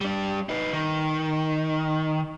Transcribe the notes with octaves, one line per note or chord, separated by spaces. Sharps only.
G3 D4
D#4 B4
D#3